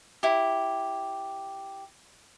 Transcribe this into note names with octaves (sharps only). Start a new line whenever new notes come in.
E4 G4